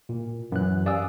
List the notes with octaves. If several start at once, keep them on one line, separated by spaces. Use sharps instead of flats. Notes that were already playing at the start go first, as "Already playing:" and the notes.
A#2
F#2 E3 F#6
G4 D5 F5 G#5 D#6 E6